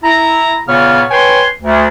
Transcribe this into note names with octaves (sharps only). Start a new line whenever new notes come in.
E4 A#5
A#2 C#3 B3 C#5 F6
B4 C#5 G5 G#5 C6
D2